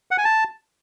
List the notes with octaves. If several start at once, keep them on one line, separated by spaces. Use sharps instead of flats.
F#5
G#5
A5